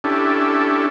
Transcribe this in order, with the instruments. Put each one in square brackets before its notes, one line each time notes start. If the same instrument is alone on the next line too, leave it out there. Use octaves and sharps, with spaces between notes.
[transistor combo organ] C#4 D4 E4 G4 A4